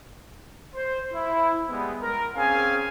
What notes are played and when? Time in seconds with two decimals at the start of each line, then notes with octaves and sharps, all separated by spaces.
0.75 C5
1.13 E4
1.69 G3 G#3 B3
2.02 A#4
2.36 C4 C#4 G#4 F5 G#5